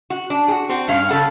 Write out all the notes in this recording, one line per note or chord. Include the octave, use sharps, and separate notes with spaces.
F#4
D4
F#4 G#4
C4 F#4
G2 C#4 F5
C#3 A4 F#5